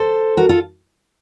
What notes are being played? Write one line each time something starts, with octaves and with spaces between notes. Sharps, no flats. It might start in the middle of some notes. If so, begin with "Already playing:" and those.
Already playing: A4 C5
F#4 A#4
F4 A4